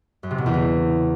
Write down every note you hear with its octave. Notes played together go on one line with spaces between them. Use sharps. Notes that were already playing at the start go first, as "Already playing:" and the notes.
F#2
C3
B2
E2
C#3